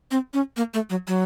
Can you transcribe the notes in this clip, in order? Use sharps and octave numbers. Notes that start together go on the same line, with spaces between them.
C4
C#4
A#3
A3
F#3
F#3